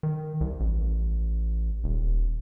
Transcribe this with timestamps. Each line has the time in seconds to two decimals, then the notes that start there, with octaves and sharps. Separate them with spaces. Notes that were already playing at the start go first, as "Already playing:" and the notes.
0.03 D#3
0.41 C2
0.60 A1
1.84 D#1